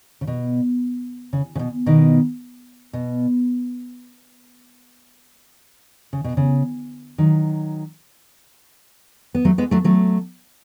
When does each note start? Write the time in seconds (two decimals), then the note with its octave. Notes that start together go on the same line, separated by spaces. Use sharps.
0.21 C#3
0.27 B2
1.33 C#3
1.55 C#3
1.59 B2
1.86 B2 D#3
2.93 B2
6.13 C#3
6.24 B2
6.37 C#3
7.18 D#3 F#3
9.35 B3
9.45 F#3 A3
9.58 G#3 B3
9.71 F#3 A3
9.84 F#3 A3